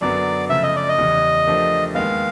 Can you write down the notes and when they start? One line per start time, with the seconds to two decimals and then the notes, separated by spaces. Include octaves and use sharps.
0.01 F#2 D3 F#3 B3 D4 D5
0.50 C#3 F3 A3 E5
0.63 D#5
0.76 D5
0.89 D#5
0.98 E2 C#3 E3 G3
1.46 F3 A3 D4 G4 A#4
1.95 D#2 D#3 G#3 B3 F5